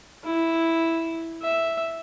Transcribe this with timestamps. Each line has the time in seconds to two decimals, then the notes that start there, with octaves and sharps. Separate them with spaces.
0.24 E4
1.42 E5